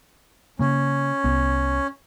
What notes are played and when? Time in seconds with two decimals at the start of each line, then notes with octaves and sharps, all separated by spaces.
0.59 C#3 A#3 C#4
1.24 C2 B3